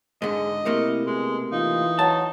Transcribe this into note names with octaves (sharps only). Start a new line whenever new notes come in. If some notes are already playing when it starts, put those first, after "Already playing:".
G#2 D3 G#4 D#5
C3 A3 A#3 E4
B2 G#3
E3 D#4 F4
F#3 A5